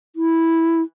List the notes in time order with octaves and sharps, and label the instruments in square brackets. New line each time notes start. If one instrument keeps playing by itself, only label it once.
[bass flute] E4